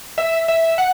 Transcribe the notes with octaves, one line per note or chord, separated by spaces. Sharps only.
E5
E5
F#5